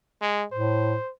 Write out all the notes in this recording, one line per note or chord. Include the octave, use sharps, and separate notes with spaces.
G#3
A2 C5